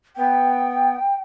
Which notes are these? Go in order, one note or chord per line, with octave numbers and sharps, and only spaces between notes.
B3 G5